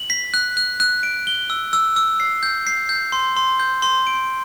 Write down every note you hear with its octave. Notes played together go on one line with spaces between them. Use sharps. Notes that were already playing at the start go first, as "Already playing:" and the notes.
Already playing: F#7
B6
F#6
F#6
F#6
D7
G7
E6
E6
E6
C7
G6
C7
G6
C6
C6
G6
C6
D7